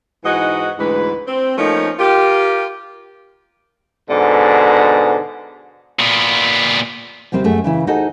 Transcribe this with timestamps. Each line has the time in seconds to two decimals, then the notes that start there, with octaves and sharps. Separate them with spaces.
0.24 G#2 E3 D#4 F#4 D#5 F#5
0.79 D2 G#2 E3 G#3 B4
1.27 C4
1.58 F3 A3 A#3 C#4 D#4
1.99 F4 G4 A#4
4.09 G#2 B2 D3
5.99 A#2 B3
7.32 D#2 C3 G3 C4 C5
7.44 F#2 A3 G#4
7.64 C#3 E3 E4
7.87 D#4 F#4 G#4 A4 C5 D#5